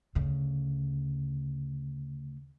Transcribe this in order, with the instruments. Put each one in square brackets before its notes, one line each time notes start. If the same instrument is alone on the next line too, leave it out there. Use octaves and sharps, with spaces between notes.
[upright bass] D2 C#3